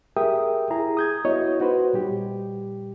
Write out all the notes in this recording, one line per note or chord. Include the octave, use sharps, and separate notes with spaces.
G4 G#4 A#4 E5 G5 D#6
E4 G#4 A#5
D#6 G6 G#6
B3 E4 F#4 C#5 D#5
D#4 F#4 B4 C5
A#2 G3 G4